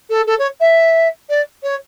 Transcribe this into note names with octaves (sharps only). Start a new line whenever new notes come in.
A4
A4
C#5
E5
D5
C#5